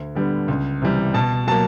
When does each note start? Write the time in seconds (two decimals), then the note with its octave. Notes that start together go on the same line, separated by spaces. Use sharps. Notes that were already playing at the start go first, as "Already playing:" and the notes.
Already playing: D2
0.15 D3 G3 B3
0.48 C#2
0.82 C3 E3 G3
1.14 B2 A5
1.47 F#3 A#3 A5